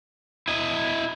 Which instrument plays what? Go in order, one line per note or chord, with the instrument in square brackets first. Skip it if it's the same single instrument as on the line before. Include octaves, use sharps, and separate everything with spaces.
[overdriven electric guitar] E4 D#5